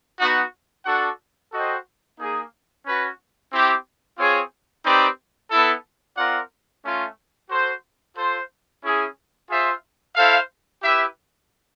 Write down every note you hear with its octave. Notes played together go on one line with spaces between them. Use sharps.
B3 D#4 F#4
D4 F#4 A4 D5 F#5
F#4 A4 C5 D#5 G5
A#3 D#4 G#4
C#4 F#4 B4
C4 E4 G4
C4 F4 G#4 C#5
C4 D#4 G4 B4 D5
B3 E4 A4
C4 F4 A#4 D5 F#5
A3 C#4 F4
F#4 A4 C5
F4 A4 C5
C#4 E4 G#4
F4 G#4 C5 E5
E4 A4 C5 F5
E4 G4 B4 E5